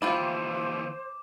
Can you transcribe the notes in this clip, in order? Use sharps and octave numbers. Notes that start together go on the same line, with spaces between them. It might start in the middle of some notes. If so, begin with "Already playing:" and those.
D#2 E3 E4 F4 C5 G5 D6